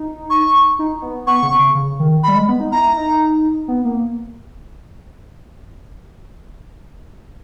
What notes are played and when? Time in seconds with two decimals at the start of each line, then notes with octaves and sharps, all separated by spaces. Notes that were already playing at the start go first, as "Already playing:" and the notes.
Already playing: D#4
0.30 C#6
0.79 D#4
1.02 B3
1.27 B3 C#6
1.43 C#3
1.59 C#3
1.75 C#3
2.00 D#3
2.23 G3 B5
2.36 G#3
2.48 B3
2.60 D#4
2.72 E4 A#5
2.96 D#4
3.68 B3
3.85 A#3